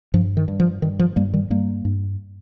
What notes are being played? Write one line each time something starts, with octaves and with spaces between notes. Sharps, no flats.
G2 F3
D#3
G2
F3
G2 D#3
F3
G2 G3 A#3
D#3 G3
G2 G3 A#3
G2